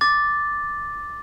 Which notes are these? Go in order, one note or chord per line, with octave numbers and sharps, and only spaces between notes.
D6 A6